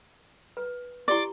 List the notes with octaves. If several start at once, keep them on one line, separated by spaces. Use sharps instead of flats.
B4
E4 G4 D5 C6 C#6